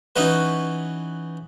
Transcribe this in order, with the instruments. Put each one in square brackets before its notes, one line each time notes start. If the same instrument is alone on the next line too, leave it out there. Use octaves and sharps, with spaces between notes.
[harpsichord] E3 C#4 D#4 F#4 B4